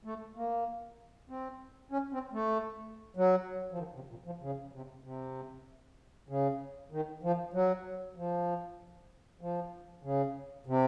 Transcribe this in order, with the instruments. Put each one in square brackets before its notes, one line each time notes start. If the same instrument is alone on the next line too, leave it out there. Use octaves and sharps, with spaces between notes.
[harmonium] A3
A#3
C4
C#4
C4
A3
F#3
F3
D#3
C3
A#2
F3
C#3
C3
C3
C#3
D#3
F3
F#3
F3
F3
C#3
C3